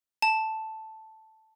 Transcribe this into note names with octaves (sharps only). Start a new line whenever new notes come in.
A5